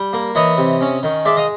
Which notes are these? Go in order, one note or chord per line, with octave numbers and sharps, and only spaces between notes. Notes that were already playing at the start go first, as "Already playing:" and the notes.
Already playing: G3
A#3
E3 C#5 D#5
C3
C#4
D#3
G#3 D5 E5
D#5 F5